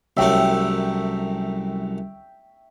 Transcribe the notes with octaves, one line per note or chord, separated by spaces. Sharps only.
C2 F#2 A3 E5 G5 C#6